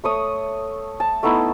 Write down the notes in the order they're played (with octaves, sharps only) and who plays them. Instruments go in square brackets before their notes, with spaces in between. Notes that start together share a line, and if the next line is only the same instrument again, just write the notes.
[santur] A3 C#5 D#6
A5
A3 B3 D#4 E4